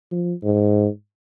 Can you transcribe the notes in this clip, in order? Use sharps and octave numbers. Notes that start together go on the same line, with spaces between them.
F3
G#2